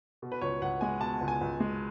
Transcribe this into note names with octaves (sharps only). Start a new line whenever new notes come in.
B2
B4
C#2 C#5
C#2 F#5
G#3 G#5
B2 A5
C#2
G#5
C#2
G#3